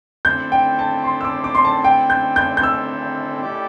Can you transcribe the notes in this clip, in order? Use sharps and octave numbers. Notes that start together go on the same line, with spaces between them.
D3 A3 C4 E4 G6
G5
A5
C6
E6
D6
D6
C6
A5
G5
G6
G6
G6
E6
A3 E4 G4 D5